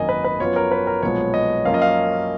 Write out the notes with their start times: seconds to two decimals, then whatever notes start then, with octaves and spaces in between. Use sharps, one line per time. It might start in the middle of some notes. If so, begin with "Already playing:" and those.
Already playing: G#1 F#2 D#3 A#3 D#5 G#5
0.09 B4
0.24 B4
0.40 F#2 F3 B3 F4 C#5
0.56 A#4
0.71 B4
0.87 A#4
1.03 B1 A#2 F3 G#3 B3 C#5
1.34 D#5
1.65 F#2 F3 A#3 C#4 F4 F5
1.74 D#5
1.82 F5